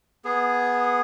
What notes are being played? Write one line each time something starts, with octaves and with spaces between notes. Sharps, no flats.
B3 G#4